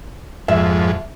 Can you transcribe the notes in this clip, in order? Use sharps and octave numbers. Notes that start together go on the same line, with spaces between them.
F2 G#2 E5